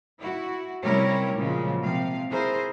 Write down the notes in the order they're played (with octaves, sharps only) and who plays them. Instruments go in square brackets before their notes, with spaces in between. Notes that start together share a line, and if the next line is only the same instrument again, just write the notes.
[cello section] E4 F#4
C3 G3 C#4 E4 A#4 C#5
A#2 C#3 F3 F#3 G#3
C3 F3 F5
E4 G#4 A#4 C5